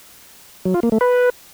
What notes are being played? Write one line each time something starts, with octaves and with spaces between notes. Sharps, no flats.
F#3
F4
A#3
A3
B4